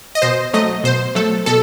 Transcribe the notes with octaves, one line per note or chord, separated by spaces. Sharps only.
D#5
B2 C5
F#3 A3 D#5
B2 C5
F#3 A3 A4
B2 A4